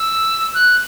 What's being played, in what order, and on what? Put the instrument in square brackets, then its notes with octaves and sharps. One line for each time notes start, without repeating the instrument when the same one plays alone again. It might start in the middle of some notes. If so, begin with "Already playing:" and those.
Already playing: [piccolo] E6
F#6